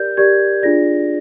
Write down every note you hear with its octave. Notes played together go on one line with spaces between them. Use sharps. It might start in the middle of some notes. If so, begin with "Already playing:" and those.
Already playing: G4 A#4 D5 G6
G4 A#4 D5 G#6
D4 F4 G#4 D5 A#6